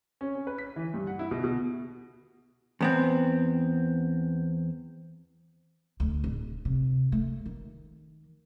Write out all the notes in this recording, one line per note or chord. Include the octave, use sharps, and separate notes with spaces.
C#4
C#4
B4
B6
E3
G2
F#5
E4
B2
B2
E2 B3 C4
D2
D1
C3
A3
D#3